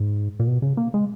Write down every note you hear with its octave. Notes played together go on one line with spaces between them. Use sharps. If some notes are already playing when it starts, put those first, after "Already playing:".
Already playing: G#2
A#2
B2
C#3
A#3
G#3